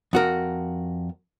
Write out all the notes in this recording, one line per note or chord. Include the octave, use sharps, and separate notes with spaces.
F2 F#4 A#4